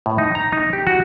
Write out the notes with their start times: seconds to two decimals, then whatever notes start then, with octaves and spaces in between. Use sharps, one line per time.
0.06 A2
0.18 D#4
0.35 A#5
0.52 D#4
0.73 G4
0.87 F#4